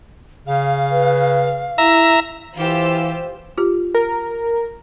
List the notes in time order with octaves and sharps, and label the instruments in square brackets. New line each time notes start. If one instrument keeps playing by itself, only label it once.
[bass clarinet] C#3 [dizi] F5
[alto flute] B4
[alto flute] E4 [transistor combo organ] E5 A#5
[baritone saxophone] E3 [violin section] F4 G4 E6 [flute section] C5
[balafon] F4 G4
[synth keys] A#4